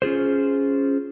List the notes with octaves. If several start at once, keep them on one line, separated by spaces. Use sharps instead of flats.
C#4 F4 G#4 C5